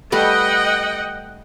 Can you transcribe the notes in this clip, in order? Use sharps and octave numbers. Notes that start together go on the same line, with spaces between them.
G3 A3 B4 D#5 F#5 G5